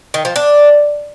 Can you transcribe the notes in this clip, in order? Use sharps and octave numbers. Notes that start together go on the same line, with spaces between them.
D#3
F3
D4